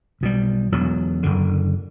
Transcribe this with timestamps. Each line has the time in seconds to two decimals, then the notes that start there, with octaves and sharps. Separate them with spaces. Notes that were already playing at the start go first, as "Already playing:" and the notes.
0.21 B1 B2 G3
0.72 E1 E2 B2 F#3
1.23 F#1 F#2 D3